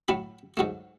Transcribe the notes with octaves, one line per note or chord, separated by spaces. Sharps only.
A2 F#3 A3 B5
G#2 F#3 A3